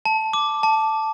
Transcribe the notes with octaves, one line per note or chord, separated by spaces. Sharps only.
A5
D6
A5